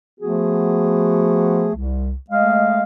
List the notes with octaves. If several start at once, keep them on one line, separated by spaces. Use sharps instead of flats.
F3 A3 B3 F#4 G#4
C2
G#3 A3 D#5 F5